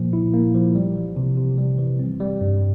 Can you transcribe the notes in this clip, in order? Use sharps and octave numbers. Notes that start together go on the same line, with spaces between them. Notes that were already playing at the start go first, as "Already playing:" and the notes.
Already playing: A#2 F3 A#3
E4
A#3
F3
G3
E3
C3
C3
G3
E3
C4
G3
G2